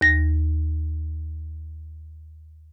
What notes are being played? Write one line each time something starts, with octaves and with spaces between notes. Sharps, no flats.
D#2 A#6